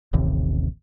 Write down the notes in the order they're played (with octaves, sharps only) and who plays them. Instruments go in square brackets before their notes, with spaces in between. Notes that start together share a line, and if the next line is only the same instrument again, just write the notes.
[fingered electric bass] D#1 A1 D#2 C3